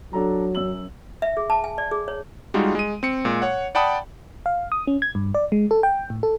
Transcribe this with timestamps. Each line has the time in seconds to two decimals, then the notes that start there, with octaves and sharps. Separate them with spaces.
0.13 F#3 D4 A4 A#5
0.55 F#2 E6 F#7
1.22 E5
1.37 G#4
1.50 A5
1.64 G#5
1.78 D5
1.91 G#4
2.08 C#5
2.54 G3 G#3 D#4 F4 F#4
2.75 G#3 D#7
3.03 C4 C#7
3.25 A#2 G#3
3.42 C#5 F#5
3.75 D5 F#5 G5 A5 B5 D#6
4.46 F5
4.72 D#6
4.87 C#4
5.02 G#6
5.15 G2
5.34 D5
5.52 G#3
5.71 A4
5.83 G5
6.10 A2
6.23 A4